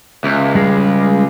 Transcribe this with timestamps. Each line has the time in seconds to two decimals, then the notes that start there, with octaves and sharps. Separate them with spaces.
0.24 C#2 E5
0.55 G3 G#3 G#4